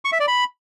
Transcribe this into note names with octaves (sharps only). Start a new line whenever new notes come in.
C#6
E5
D5
B5